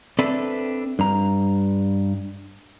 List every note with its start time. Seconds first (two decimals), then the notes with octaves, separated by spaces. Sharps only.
0.19 C4 D4 A4 B4 D5 E5
0.99 G2 A#5